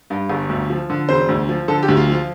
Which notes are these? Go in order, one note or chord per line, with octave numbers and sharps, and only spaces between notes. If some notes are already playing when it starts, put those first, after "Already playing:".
G2
G1
D2
F3
D3
E1 C5
D2
F3
D3 A4
G4
D2
F4
F3 F4